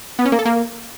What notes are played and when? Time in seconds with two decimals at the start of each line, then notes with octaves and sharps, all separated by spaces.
0.19 B3
0.25 C#4
0.32 A#3
0.39 A4
0.45 A#3